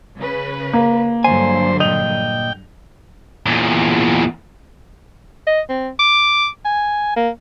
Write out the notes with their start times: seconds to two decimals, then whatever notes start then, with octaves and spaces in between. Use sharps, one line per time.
0.17 C#3 B4
0.73 A#3
1.24 G2 D3 F#3 C5 G#5
1.80 A#2 D#5 G5 F7
3.46 E2 A#2
5.47 D#5
5.69 C4
5.99 D6
6.65 G#5
7.16 A#3